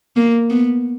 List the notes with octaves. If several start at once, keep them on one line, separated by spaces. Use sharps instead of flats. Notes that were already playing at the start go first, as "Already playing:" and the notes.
A#3
B3